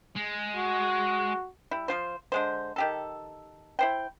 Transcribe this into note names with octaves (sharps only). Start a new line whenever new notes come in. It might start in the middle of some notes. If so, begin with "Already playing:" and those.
G#3
F#4
G3 E4
F3 F4 C5
D3 G#3 C5
D#3 G4 A4
E4 C5 G5